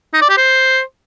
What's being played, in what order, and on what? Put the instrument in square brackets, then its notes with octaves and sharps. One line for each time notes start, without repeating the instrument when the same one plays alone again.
[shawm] D#4
D5
G4
C5